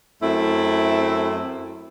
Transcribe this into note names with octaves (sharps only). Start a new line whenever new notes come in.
F#2 A3 C4 E4